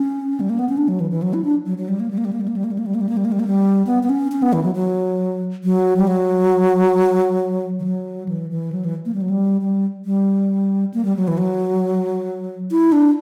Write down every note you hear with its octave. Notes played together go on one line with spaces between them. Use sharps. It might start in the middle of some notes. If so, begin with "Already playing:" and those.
Already playing: C#4
G3
A#3
B3
C#4
D4
F#3
E3
E3
F#3
E4
D4
F#3
F#3
G3
A#3
G3
A#3
G3
A#3
G3
A#3
G3
A#3
G3
A#3
G3
A#3
G3
A#3
G3
A#3
G3
A#3
G3
B3
B3
C#4
C#4
B3
E3
F#3
F#3
F#3
G3
F#3
E3
F#3
E3
E3
F#3
E3
A#3
G3
F#3
G3
G3
G3
A#3
G3
F#3
E3
F#3
E4
D4